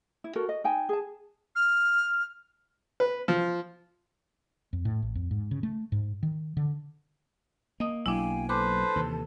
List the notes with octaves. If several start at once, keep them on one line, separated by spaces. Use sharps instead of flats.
E4
F#4 A4 A#4
D#5
D#4 G5 G#5
G#4 A5
F6
B4
F3
F2
A2
A1
F2
G#2
C#3
A3
G#2
D#3
D3
A#3 D#5 D#6
B1 F#3 A#3 D4 E4 F5 G5 G#5
A4 B4 C5 A5 D6
D#2 C3 E3